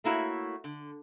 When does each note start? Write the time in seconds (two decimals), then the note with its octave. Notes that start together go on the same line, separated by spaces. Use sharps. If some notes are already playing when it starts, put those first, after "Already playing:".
0.04 A3 A#3 E4 F#4 C#5
0.64 D3